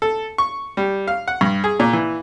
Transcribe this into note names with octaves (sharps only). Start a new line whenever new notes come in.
A4
C#6
G3
F5
F#5
G2
G#4
A#2
E3